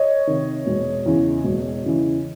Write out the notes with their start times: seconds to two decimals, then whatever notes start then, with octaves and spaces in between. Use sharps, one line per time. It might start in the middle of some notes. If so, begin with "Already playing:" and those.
Already playing: C#5 D#5
0.27 C3 D#3
0.67 E1
1.06 E2 C#3 E3
1.44 E1
1.85 E2 C#3 E3